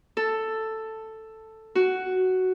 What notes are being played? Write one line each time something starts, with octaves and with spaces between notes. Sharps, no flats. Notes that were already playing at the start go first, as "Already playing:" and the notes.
A4
F#4